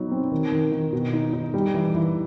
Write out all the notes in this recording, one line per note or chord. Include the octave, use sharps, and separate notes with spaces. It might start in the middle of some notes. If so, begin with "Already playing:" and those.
Already playing: F#3 B3 D#4
C4
D#3
D#3
D#3
B2
D#4
D#4
G3
E3
E3